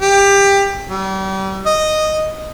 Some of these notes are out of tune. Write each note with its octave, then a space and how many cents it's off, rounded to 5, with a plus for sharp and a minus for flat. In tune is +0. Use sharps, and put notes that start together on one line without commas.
G4 +20
G3 -35
D#5 -5